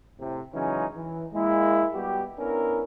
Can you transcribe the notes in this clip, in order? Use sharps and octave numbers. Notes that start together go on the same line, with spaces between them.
A2 C3
C#3 E3 F#3 G#3 C#4 D#4
E3
G#3 A#3 E4
G3 B3 F#4 G4
B3 C#4 D4 E4 A#4